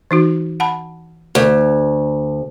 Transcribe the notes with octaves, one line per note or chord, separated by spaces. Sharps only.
E3 D#4 F#4
F#5 A5 B5
D2